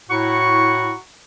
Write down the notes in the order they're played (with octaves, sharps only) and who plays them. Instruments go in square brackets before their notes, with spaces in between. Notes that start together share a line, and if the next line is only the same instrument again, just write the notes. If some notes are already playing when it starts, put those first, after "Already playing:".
[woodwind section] A2 E4 F#4 F#5 A#5 C#6